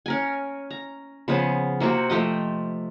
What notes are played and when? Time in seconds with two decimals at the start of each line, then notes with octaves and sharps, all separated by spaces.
0.06 C#4 A#4 G#5
0.71 A#5
1.28 C#3 F3 B3 G#4
1.80 C3 A#3 C4 F#4
2.10 F3 A3 G4 D#5